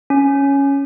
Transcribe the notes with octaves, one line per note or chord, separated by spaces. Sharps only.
C#4